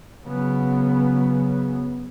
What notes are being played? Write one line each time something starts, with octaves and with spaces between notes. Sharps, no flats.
C#3 F#3 B3